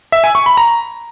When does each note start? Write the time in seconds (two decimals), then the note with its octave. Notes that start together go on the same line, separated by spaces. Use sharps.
0.12 E5
0.24 G#5
0.35 C#6
0.46 B5
0.57 A#5